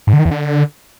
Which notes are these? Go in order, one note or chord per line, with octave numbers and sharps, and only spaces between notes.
G#2
D3
D#3
E2
D3